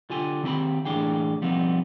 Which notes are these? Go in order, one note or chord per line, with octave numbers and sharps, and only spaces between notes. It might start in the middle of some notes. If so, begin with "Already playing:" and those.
D3 F4 G4 G#5
D#3 C4 G4 G5 B5
A2 E3 D4 G4 G#4 G5
F3 G3 B3 C4 D#4